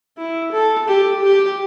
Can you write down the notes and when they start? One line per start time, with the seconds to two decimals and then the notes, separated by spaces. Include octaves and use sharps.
0.18 E4
0.52 A4
0.88 G4
1.23 G4